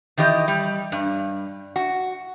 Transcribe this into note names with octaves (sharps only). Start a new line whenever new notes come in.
D#3 E3 G4 D#5
G3
G2
F#4